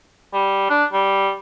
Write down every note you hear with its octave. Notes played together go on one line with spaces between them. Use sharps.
G3
D4
G3